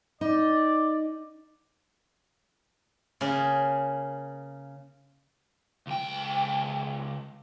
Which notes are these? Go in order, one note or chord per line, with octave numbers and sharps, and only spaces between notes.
D#4 D5
C#3 A#3 G#4
C#2 G5